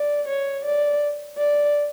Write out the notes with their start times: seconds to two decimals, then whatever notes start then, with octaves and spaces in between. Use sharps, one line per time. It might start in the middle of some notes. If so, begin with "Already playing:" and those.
Already playing: D5
0.29 C#5
0.65 D5
1.38 D5